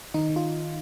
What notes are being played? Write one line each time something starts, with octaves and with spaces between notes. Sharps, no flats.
D#3 D#4
D#3
F4